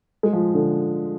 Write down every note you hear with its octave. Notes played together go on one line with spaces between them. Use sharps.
G#3
F3
D3